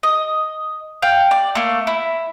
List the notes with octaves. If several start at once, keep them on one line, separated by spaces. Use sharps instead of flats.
D#5
F5 G5
D5
A3 A#3
E4